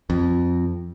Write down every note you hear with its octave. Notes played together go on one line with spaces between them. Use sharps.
F2